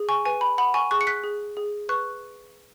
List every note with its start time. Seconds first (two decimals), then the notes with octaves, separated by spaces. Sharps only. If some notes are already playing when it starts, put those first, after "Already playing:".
Already playing: G#4
0.09 G#5 C#6
0.25 B4 G#5
0.41 B5
0.58 F#5 B5
0.74 G#5 C#6
0.91 G#4 C#6 F#6
1.01 C#7
1.07 F#6 B6
1.24 G#4
1.57 G#4
1.89 B4 C#6 F#6